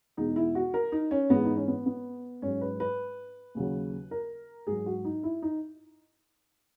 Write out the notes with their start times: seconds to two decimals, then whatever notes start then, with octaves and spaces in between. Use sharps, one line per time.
0.17 E2 B2 G#3 D#4
0.36 E4
0.55 F#4
0.74 A#4
0.92 D#4
1.11 C#4
1.30 G#2 E3 G#3 B3
1.45 D#4
1.56 C#4
1.67 B3
1.86 B3
2.42 G#2 F#3 C#4
2.61 B4
2.80 B4
3.55 D#2 C#3 F#3
4.11 A#4
4.67 G#2 F#3 G#4
4.86 F#4
5.05 D#4
5.23 E4
5.42 D#4